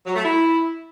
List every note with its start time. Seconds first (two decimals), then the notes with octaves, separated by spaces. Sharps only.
0.06 F#3
0.15 A3
0.23 E4